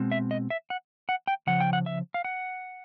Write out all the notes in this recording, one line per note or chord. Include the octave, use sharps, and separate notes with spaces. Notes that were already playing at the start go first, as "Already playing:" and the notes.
Already playing: B2 G#3 C4
E5
D#5
E5
F#5
F#5
G5
C#3 F3 F#5
G5
F#5
E5
F5
F#5